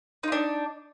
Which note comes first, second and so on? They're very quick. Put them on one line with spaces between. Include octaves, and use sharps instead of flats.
D#4 F4 D4